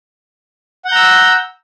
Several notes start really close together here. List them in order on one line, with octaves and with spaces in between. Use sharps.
F#5 G6 A#5 E6